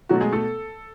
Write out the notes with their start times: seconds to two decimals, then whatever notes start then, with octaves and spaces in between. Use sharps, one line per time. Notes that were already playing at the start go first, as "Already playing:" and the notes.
0.09 B2 F#3 A3 F#4
0.21 G#3 G#4
0.32 A3 A4